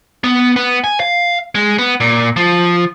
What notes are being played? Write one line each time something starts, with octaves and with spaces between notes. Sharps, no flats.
B3
B3
G#5
F5
G#3
B3
A#2
F3